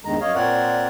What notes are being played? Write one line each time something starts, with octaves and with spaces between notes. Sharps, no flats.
E2 G2 D#3 G#3 A#5
F#2 C#5 D#5 F5
A#2 C4 A#4 C#5 D5 F#5